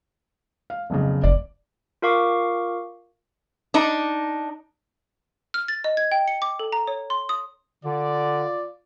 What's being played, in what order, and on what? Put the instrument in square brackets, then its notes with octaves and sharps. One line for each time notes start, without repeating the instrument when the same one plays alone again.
[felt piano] F5
F1 B1 C#3
[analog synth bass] F1 [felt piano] D5
[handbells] F4 A#4 F5 C#6 D6
[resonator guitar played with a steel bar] D4 D#4
[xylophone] F6
A6
D#5
G#6
G5
C#7
D6
A4
A#5
C#5
C6
D#6
[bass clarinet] D3 [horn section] F4 D5